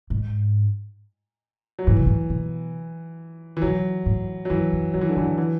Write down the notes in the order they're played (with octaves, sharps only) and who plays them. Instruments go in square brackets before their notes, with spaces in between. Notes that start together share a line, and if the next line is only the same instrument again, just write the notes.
[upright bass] G#2
[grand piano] F#3
[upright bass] A2 [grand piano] E3
[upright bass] B2
A2
B2
[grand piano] E3
[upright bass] B2 [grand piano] F#3
[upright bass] A2
[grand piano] F#3
[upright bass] G#2 [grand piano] E3
[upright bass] F#2
[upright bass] F#2 [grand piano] F#3
[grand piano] E3
D3
[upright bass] G#2 [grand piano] E3
[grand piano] E3